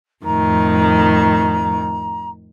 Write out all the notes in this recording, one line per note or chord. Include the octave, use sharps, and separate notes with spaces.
F2 A2 D#3 A#5